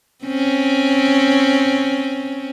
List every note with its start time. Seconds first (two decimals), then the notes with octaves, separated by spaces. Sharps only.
0.25 C4 C#4